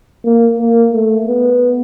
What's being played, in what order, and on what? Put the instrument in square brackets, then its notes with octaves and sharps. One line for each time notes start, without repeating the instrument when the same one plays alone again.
[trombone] A#3
A#3
A3
B3